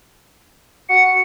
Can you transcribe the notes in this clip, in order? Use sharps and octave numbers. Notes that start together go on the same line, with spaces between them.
F#4 C#7